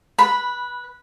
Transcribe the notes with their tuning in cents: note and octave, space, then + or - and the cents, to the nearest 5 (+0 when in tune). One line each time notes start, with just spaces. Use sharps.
B4 -15 B5 +0